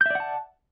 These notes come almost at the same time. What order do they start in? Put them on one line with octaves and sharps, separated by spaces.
G6 E5 D5 F#5 A5